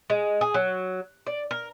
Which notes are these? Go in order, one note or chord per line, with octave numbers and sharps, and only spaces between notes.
G#3
G#4
F#3
D5
A#4